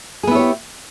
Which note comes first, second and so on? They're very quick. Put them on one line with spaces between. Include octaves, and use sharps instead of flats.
G#4 B3 E4 C#5 G4